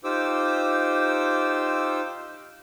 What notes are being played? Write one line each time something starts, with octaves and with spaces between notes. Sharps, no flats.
D#4 F4 G4 C5 D6 E6